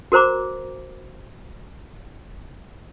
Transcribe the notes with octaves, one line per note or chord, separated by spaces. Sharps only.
F#4 A#4 C5 A#5 D6